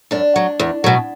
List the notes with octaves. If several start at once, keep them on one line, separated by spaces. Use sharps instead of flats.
F#2 D4
F#3
E2
B2 F#3